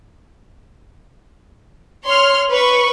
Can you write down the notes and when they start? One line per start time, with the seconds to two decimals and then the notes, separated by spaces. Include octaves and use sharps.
2.07 C#5 C6 F6
2.51 B4 B5 C#6